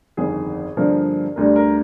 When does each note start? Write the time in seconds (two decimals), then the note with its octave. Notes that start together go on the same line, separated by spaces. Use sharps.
0.17 G1 F2 D#3 G#4
0.77 G2 D3 F3 A#3
1.36 D2 D3 G3 A#4
1.56 A#4